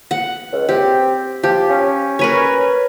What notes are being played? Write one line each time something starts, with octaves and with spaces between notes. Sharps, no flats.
F#5
C#2
C4 G4
F3 G4
C#4
A#4 B4 C#5